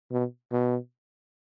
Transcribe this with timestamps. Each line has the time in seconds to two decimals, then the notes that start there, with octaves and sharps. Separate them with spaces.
0.12 B2
0.52 B2